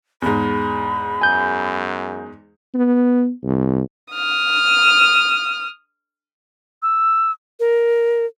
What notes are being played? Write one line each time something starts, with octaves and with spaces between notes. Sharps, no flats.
E2 G#2 B5
F#2 G#5 G6
B3
C2
D#6 F6
E6
A#4